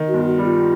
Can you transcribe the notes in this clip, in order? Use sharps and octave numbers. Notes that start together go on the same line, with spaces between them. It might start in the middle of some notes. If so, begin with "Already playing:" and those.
Already playing: D#3
F#4
G1
F#4
G3
F4